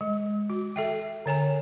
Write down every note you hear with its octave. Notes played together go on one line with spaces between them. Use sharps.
G#3
F#4
A4 E5 G5
D3 C#5 G#5 A#5